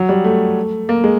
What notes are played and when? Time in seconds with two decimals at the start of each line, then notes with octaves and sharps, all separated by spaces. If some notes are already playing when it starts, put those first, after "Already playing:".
Already playing: F#3
0.09 G3
0.24 A3
0.89 A#3
1.04 G#3